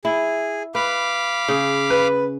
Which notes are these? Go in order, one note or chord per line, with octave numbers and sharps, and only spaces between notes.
E4 G#4
B4 F5 B5 D6
C#3
B4